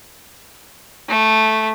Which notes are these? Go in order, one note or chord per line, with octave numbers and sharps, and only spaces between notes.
A3